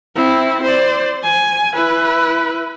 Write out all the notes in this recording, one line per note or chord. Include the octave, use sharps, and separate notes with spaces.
C4 E4
C5 D5
G#5
E4 B4